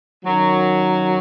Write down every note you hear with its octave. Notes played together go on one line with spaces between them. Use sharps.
F#2 D#3 F#3